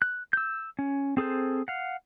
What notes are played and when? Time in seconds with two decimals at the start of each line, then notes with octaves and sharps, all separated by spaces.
0.02 F#6
0.33 E6 G6
0.79 C#4
1.17 C4 G#4 A4 C5
1.68 F5 F#5